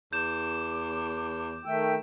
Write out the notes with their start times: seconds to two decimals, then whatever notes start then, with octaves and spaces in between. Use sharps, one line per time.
0.13 E2 D6 G6 E7
1.65 D#3 A3 E5 G5 E6